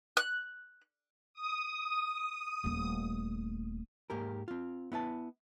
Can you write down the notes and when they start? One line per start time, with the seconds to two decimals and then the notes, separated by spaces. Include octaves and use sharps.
0.17 F#6
1.34 D#6
2.64 D#1 A3
4.10 G#2 A#3 G4 A#4
4.48 C4 F4
4.92 B3 E4 B4 A5